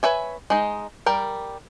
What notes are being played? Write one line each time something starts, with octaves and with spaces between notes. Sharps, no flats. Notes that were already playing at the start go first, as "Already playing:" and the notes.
B4 C#5 E5 G#5
G#3 D#4
G3 A#4 G5